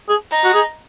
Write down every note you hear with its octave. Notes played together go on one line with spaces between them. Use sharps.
G#4
D#4
F#4
G#4